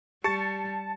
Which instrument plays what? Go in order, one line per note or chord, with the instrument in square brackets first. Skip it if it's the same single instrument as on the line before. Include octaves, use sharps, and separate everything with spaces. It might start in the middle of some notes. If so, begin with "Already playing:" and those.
[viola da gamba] G3 [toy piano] G4 [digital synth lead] A5 [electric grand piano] A6 C#7